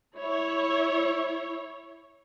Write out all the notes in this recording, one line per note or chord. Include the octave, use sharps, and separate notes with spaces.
E4 C#5